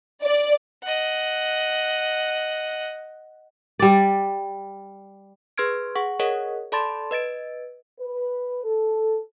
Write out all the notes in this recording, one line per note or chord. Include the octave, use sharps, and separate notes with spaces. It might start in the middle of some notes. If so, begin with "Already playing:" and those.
D5
D#5 F#5
G3 D5
G#4 B4 C6 F6 G#6 D7
G#4 F#5 C#6
G#4 A#4 C#5 D#5 F#5
A4 D5 A5 B5 C6 A6
B4 D#5 A6 D7
B4
A4